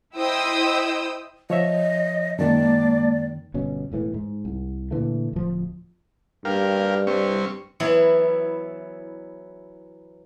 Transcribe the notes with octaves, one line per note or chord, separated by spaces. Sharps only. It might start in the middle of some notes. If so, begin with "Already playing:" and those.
E4 C5 D#5 G5 D#6 E6
F3 C#5 D#5 E5
F#2 D#3 G#3 A#3 D5 A5
G1 B2 C#4
E1 A2 E3 A3
G#2
C2
A#2 D3 E3 A3
D1 F3
G2 G4 A#4 F5
G3 C4 C#6
E3 F#3 B3 E4